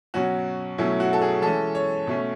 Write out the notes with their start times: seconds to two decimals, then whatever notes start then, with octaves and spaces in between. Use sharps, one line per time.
0.14 B2 F#3 C#4 F#4
0.78 B2 F#3 A3 C#4 E4
1.00 F#4
1.13 A4
1.22 G#4
1.42 E3 G#3 C#4 A4
1.75 C#5
2.07 B2 A3 C#4